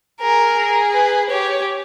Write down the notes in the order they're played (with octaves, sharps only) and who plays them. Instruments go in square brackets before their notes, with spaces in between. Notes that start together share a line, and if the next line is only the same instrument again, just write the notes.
[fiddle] G#4 [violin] A#4
[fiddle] G#4
[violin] B4
[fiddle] G4 [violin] C#5